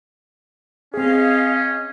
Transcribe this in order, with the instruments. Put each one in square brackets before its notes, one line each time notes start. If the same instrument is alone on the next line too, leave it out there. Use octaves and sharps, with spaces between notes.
[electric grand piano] C4 G#4 [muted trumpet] C#4 [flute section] D#5 F5